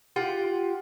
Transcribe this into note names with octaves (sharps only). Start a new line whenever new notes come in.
F4 G4 F#5 G5